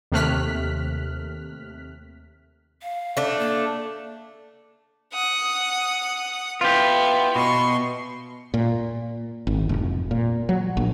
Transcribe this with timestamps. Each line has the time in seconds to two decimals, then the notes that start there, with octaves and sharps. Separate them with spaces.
0.12 D#2 C3 A3 F6 F#6 B6
2.82 F5
3.17 A3 D4
3.39 A#3
5.13 F#5 D#6
6.61 B3 E4 F4 G4
7.35 B2 C6 C#6
8.54 A#2
9.47 G#1
9.69 F1
10.11 A#2
10.49 F#3
10.77 A#1